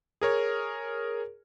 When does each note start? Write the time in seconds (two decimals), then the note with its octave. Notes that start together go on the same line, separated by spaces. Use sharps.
0.21 G#4 A#4 C#5